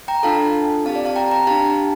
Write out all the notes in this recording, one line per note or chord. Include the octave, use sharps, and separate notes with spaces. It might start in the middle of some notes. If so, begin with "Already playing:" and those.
G5 A#5
D4 F4 A4 F5 A5
C4 G4 F5 A5
D5 F5
F5 A5
G5 A#5
G5 A#5
D4 G4 F5 A5